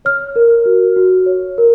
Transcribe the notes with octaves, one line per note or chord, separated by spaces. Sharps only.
C#5 F6
A#4
F#4
F#4
C#5
A#4